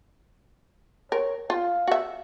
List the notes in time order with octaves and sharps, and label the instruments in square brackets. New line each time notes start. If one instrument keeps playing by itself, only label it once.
[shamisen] A#4 [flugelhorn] C#5
[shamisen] F4 [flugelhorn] F5
[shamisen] F#4 E5